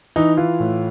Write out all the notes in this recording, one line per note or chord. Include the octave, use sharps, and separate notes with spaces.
E3 D#4
E3 F4
A2